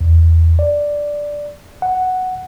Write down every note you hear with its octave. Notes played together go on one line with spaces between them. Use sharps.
E2
D5
F#5